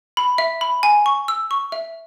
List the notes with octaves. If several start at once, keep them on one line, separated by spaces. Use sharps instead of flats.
B5
E5
B5
G#5
C#6
E6
C#6
E5